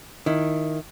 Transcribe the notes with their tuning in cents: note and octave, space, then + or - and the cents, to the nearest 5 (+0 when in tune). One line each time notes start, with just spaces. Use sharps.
D#3 +0 E4 +10